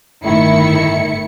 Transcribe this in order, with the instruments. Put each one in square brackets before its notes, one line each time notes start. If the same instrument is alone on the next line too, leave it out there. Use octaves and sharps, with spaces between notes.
[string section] G1 A2 D#3 E4 C#7